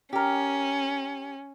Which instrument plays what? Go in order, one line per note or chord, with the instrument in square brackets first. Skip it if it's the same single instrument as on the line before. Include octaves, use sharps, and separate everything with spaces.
[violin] C#4 [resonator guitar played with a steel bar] G4 A#4